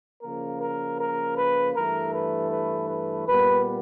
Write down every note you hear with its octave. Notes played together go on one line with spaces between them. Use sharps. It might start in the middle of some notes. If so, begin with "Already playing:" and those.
C#3 F3 A#3 A#4
A#4
A#4
B4
G2 E3 A3 A#4
B4
B4
B4
A#2 G3 B3 B4